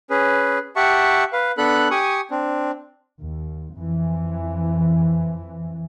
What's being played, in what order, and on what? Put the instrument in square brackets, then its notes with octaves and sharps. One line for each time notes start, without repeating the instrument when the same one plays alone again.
[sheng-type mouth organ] C#4 G#4 B4
G4 E5 F#5 A5 C#6
B4 F5
B3 D4 A4 B5 F#6
G4 G#5 C#6 D#6
C4 D4
[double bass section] D#2
F2 E3